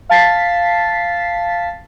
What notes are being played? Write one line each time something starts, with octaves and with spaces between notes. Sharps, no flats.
F5 A5 A6 B6 C7